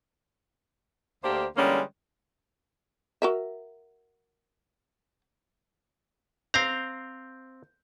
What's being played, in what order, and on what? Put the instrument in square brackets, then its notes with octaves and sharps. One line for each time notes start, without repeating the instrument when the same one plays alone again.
[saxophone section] D2 A#3 D4 G4 C5
D3 E3 G3 G#3 A#3 C#4
[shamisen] F#4 A#4 E5
[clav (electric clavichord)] C4 F5 A#5 [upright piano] G6